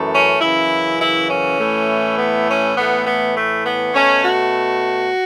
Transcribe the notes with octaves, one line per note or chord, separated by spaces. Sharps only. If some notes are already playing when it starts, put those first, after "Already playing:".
Already playing: F#2 E3 A3
C#4
F#2 C#3 E3 E4
E4
C#4
A2 E3 A3
B3
C#4
A2 E3 A3 B3
B3
A3
B3
B2 A3 C#4
F#4